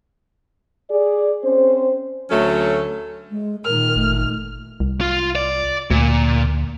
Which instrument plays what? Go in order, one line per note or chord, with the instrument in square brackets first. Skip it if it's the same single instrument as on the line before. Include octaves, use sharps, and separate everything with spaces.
[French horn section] G#4 D5
C4 C#4 C5
[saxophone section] D2 F#3 A3 C#4 A4
[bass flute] G#3
[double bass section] A#2 D#3 [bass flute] A#4 [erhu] F6
[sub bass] G1 [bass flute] A3
[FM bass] C2
[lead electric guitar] F4
D5
[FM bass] D2 [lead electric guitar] A#2